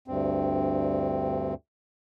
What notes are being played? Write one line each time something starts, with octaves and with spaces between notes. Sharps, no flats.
D2 G2 C4